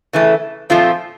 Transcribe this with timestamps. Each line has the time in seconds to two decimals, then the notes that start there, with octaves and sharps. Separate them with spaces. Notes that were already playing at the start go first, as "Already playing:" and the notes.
0.13 C#3 E3 A3
0.70 A#2 F3 A3 C4 F4